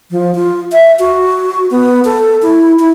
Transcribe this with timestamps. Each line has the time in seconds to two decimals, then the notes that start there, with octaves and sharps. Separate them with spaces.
0.11 F3
0.35 F4
0.72 E5
0.99 F#4
1.71 B3
2.05 A4
2.42 E4
2.79 E4